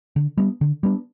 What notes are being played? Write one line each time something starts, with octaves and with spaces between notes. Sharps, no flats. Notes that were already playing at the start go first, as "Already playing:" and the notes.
D3
G3 B3 D4
D3
G3 B3 D4